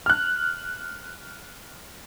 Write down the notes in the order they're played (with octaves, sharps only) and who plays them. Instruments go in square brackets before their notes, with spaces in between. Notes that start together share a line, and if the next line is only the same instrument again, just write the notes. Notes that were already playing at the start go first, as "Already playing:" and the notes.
[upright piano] F6 F#6